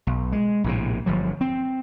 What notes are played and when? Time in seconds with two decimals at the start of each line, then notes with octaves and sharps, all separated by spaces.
0.07 B1
0.32 G#3
0.64 A#1 A2 C3
1.06 G1 F3 F#3
1.41 C4